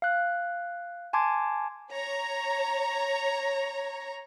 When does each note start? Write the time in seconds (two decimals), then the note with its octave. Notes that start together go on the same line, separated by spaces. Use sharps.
0.02 F5 F#6
1.13 G#5 A5 C6 D6 G#6
1.91 C#5 A#5